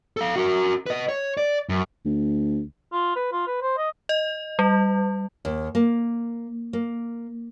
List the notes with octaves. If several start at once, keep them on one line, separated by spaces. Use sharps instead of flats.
A4 F5
F#4 A#4
B4 D#5
C#5
D5
F#2
D2
F4
B4
F4
B4
C5
D#5
D#5
G3
D#2
A#3
A#3